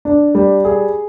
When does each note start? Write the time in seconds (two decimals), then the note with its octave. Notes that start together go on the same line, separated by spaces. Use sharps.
0.05 D4
0.35 G3
0.65 G#4